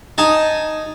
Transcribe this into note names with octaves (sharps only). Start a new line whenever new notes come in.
D#4 G#5 A5